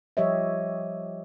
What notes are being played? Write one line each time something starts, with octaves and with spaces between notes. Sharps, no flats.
F3 G3 G4 C#5 D#5 E5